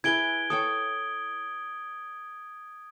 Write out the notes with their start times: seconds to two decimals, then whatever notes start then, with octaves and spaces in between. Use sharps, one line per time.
0.04 E4 G#4 B4 G#6 D7 G7
0.50 A4 C#5 G5 D#6